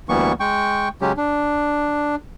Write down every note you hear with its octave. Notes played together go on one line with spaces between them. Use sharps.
D2 E3 G3 A#3 B3 C#6
G#3 G5 C#6
C#3 F#3 G#3 C#4 G4
D4